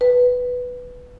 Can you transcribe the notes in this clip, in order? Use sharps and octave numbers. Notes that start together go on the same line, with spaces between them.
B4